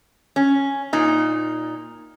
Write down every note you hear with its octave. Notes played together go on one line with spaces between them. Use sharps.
C#4
A#2 D#4